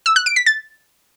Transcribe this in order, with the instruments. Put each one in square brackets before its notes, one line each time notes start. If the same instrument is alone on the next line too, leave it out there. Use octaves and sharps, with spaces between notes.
[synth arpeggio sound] E6
F#6
D7
B6
A6